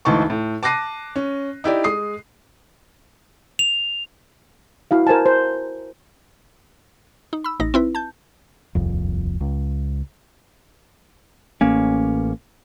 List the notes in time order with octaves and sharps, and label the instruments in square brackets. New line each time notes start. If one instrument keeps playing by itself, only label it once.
[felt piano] G#1 D2 E3 D#4 A5 C#6
A2
A5 D6 F#6 A#6 C7 D#7
C#4
D#4 E4 G4 D5
G#3 D#6 C7
[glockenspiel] F7
[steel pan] E4 F#4 F5
A#4 C5 G#5 A5
C5
[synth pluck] D#4
B5 E6
A1 D#4 A#6
C4 E4 B4
A5 G6
[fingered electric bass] D#1 C2 F2
C#2
[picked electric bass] A1 A#3 C#4